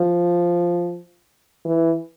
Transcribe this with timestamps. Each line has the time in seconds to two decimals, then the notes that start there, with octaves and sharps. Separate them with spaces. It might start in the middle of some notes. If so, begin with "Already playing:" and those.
Already playing: F3
1.65 E3